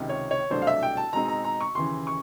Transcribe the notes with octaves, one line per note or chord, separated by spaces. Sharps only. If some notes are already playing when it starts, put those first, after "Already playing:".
Already playing: C#2 C3 D#3
C#5
C#5
C2 B2 F#3 A3 D4 C5
F5
E5
G5
A5
B2 G#3 C4 D#4 A#5
A#5
A#5
C#6
D#2 C#3 E3 C6
C#6